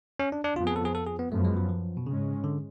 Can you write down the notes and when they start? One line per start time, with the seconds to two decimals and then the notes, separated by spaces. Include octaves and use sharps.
0.19 C#4
0.32 D4
0.44 D4
0.56 F2 F3 B3 F4
0.67 G#4
0.76 A4
0.85 G#4
0.95 A4
1.07 G#4
1.19 B3
1.32 F#2 F3 A3 B3
1.45 G#3
1.57 F#3
1.69 F3
1.97 B2
2.06 G#2 C#3 G#3 C#4
2.44 D3